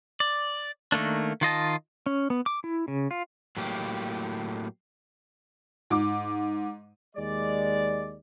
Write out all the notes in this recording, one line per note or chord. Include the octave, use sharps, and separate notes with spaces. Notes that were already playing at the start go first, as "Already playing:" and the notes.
D5
D#3 A3 A#3 D4
D#3 F4 D#5 A5
C#4
B3
D6
E4
C#3
F4
A2 F#3 A#3 G4
G#2 D6
D#2 G#3 D5